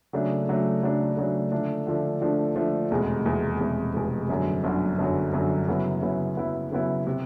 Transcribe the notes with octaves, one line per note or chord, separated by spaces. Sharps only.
C#3 F#3 A3 D4
C#3 F#3 A3 D4
C#3 F#3 A3 D4
C#3 F#3 A3 D4
D3 F3 A3 D4
D3 F3 A3 D4
D3 F3 A3 D4
D3 F3 A3 D4
F1 E2 B2 G#3
F1 E2 B2 G#3
F1 E2 B2 G#3
F1 E2 B2 G#3
G1 F#2 D3 F#3
G1 F#2 D3 F#3
G1 F#2 D3 F#3
G1 F#2 D3 F#3
C#3 F#3 B3 E4
C#3 F#3 B3 E4
C#3 F#3 B3 E4
C#3 F#3 B3 E4
C3